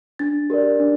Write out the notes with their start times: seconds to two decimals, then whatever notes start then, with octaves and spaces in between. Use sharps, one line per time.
0.19 D4 A6
0.50 G4 A#4 D5
0.79 D4